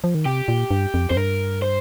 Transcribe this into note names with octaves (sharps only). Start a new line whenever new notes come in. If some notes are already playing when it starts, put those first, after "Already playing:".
F3
D#3
C3 G4
A#2
G2
F2
F2 C5
G2 A#4
C5